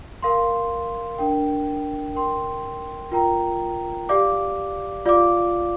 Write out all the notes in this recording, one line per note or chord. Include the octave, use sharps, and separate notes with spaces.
A#4 F5 C6
D4 A#4 G5
A#4 G5 C6
F4 A#4 G5 A#5
G4 D5 F5 D6
F4 D5 F5 D6